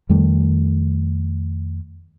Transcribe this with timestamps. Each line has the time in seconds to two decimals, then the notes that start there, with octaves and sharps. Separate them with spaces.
0.09 F2 D#3 G3 A3